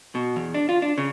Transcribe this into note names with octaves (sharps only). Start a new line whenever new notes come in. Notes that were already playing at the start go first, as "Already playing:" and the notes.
B2
E2
D4
F4
D4
C#3